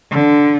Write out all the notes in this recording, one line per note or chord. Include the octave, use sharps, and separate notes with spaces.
D3